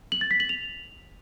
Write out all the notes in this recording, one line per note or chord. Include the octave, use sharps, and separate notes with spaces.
F#7
A6
B6
F#7
F7